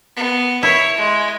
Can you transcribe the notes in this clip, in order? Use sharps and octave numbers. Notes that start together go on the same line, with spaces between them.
B3
E4 C#5
G#3